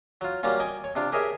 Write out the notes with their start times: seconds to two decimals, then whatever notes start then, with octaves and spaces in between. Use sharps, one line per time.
0.21 F#3 F4
0.43 F#3 G3 A#3 C#4 F4
0.60 D#5 G5 G#5
0.84 C#5
0.95 C3 D4 F4
1.12 G4 G#4 A#4 C#5 D#5 E5